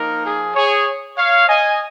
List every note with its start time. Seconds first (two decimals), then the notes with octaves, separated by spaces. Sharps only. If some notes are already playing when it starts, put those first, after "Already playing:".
Already playing: F3 A#3 D#4 A#4
0.23 G#4
0.54 G#4 C#5
1.17 C#5 F5
1.48 D#5 G#5